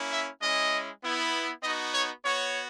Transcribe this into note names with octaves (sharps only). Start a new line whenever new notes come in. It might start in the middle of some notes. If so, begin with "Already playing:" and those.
Already playing: A#3 C#4 E4
E5
G#3 C#4 E4 D#5
B3 E4
B3 D#4 F#4 D#5
C#5
B3 F#4 C#5